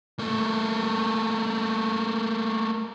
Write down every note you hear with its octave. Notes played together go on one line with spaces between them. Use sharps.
A3 A#3